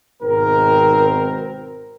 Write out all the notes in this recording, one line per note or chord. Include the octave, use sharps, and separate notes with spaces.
G#1 G#2 B2 C4 A#4